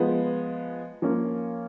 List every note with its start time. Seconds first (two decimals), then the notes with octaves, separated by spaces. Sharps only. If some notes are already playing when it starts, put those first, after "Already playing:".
Already playing: F3 G#3 B3
1.02 F3 A#3 C#4